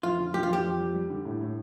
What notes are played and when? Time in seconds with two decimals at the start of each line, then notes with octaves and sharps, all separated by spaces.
0.03 F2 F4
0.18 D3
0.33 F2 G4
0.43 F4
0.49 F2 G4
0.64 F2
0.79 G3
0.95 G3
1.10 D3
1.25 A2
1.41 A2